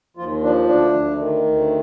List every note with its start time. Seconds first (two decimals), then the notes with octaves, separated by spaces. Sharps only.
0.17 D#2 F3 F4
0.42 F3 D4
0.67 D2 D4
0.93 D2
1.19 D#3
1.44 D2